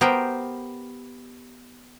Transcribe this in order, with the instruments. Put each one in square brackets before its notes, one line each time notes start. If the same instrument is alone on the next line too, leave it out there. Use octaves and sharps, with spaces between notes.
[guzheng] B3 G4 A#4 C5 G5 A#5